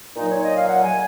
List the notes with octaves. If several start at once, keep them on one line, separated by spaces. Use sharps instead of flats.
A#2 F#3 D#4
C#5
D#5
F5
F#5
G#5